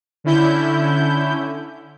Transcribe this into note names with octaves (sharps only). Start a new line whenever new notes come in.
D3 C#4 E4 G6